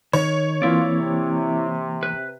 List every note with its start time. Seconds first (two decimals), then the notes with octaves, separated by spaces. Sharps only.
0.13 D#3 C#5
0.62 E3 A#3 C4 E4 F4 D5
0.98 C3
2.03 B4